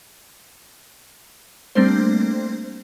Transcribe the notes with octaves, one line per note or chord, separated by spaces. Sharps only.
G3 A3 A#3 C4 D4 C5